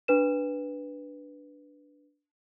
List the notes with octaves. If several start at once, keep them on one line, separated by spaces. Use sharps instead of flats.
D4 B4 E7